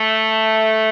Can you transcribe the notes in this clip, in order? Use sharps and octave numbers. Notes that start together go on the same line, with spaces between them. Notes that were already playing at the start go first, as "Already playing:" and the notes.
Already playing: A3